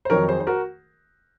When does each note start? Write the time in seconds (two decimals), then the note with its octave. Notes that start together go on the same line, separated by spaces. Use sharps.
0.05 C5
0.10 F2 D#3 F#3 A#4 C#5
0.28 G#4 C5
0.40 C5
0.47 F#4 A#4